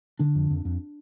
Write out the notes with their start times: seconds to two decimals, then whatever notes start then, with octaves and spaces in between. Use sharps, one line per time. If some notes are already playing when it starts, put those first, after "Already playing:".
0.19 D3 D4
0.35 F2
0.51 F2
0.65 F2